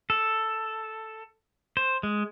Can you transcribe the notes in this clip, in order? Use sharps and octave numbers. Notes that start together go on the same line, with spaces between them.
A4
C5
G#3